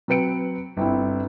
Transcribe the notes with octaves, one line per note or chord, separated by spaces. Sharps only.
F#3 C4 B4 C#7 D7
G1 C4 E4